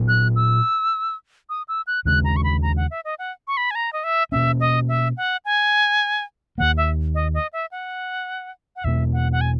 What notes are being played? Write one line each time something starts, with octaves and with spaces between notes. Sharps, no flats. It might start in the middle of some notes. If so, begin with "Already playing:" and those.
Already playing: A#2 F#3 B3
F#6
E6
D#6
E6
F#6
D#2 C#3 G#3 F#6
A#5
C#6
B5
A#5
F#5
E5
D#5
F#5
C#6
B5
G#5
A#5
D#5
E5
B2 A#3 C#4 E5
D#5
E5
F#5
G#5
D#2 D#3 A#3 F#5
E5
D#5
D#5
E5
F#5
F#5
E2 B2 A#3 E5
F#5
F#5
G#5